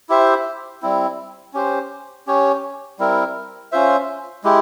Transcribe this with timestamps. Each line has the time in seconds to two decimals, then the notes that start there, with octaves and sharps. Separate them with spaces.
0.09 E4 G4 C5 E5
0.82 G3 C4 E4
1.54 C#4 G4 C5
2.27 C#4 G4 C#5
2.99 G3 C4 E4 A#4
3.72 C#4 F4 C5 E5
4.44 G#3 E4 G4